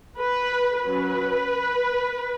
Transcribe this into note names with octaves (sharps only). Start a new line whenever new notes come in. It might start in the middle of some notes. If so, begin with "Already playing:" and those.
B4
F#3 C#4 B4